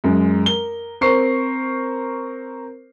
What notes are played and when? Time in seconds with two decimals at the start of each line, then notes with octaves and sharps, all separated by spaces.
0.04 F#2 G#3
0.46 A#4 G7
1.01 C4 A#4 C5 C#6 C7